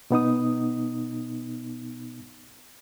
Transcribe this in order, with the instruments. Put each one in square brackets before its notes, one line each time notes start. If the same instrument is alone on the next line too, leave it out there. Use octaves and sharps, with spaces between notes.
[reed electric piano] B2 B3 D#4 D#6